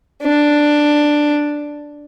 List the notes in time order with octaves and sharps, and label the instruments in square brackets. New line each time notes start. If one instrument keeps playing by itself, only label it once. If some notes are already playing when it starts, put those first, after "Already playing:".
[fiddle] D4